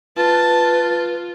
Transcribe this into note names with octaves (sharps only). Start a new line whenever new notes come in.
F4 B4 A5